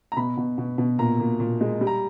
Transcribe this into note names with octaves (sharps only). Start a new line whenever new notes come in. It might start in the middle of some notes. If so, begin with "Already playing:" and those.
A#5
B2 B5
B2
B2
B2
A#2 A#5
A#2
A#2
G#3
G3
A#5